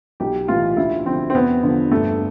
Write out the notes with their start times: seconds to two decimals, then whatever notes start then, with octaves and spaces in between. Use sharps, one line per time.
0.20 B1 G4
0.48 A2 E3 F4
0.77 D2 E4
1.06 D3 F3 C4
1.30 C4
1.34 E2 B3
1.63 D3 F3
1.91 G1 A3